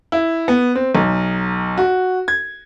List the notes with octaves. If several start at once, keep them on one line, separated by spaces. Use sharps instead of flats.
E4
B3
C4
B1
F#4
G#6